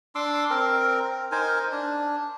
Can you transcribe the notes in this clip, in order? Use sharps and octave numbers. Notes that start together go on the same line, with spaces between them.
D4 C6 D6 E6
C4 A#4
D#4 A#4 C5 G#5
D4